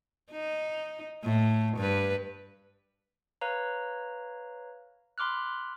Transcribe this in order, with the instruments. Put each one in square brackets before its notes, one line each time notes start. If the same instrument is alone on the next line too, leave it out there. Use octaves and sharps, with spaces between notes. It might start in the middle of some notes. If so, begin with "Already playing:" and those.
[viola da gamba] D#4
A2
G2 B4
[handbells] B4 C#5 F5 A#5
B5 C6 D6 F6 F#6